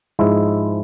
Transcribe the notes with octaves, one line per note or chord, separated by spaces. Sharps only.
G#2 F3 G#3 E4